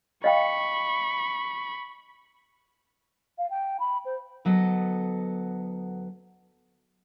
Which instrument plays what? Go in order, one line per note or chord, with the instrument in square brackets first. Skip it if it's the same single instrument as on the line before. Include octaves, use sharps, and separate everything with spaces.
[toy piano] D#5 F5 G5 [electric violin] B5 C#6
[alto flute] F5
G5
B5
C5
[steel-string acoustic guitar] D2 F#3 B3 A4 D#5